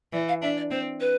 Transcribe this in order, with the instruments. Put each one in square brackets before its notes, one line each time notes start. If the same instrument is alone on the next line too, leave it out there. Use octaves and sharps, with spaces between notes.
[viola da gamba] E3 [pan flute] D5
[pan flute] F5
[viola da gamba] D4 [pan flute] E5
[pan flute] D5
[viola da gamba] C4 [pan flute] C5
[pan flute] B4